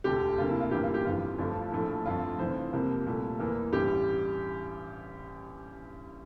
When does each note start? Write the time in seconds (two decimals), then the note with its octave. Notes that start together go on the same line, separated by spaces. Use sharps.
0.04 E1 D2 D3 A3 G4
0.38 D2 C3 F3 A#3 F4
0.49 E4
0.61 F4
0.71 A1 G2 E3 A#3 G4
0.83 F4
0.94 G4
1.05 G1 F2 E3 F4
1.38 G1 G2 F3 A3
1.72 A#1 A2 F3 A3
2.05 G1 F2 D3 A3 F4
2.39 F1 F2 E3 C5
2.73 C2 C3 F3 A#3
3.06 C2 A#2 A3
3.39 E2 E3 A#3
3.73 A1 G2 E3 G3 G4